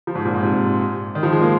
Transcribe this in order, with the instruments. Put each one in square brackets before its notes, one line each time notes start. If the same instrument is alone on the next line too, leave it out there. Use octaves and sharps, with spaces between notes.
[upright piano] F3
G#2
A#2
G#2
C3
D#3
F3
G#3
A#3